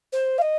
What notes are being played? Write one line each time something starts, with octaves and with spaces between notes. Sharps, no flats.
C5
F5
D#5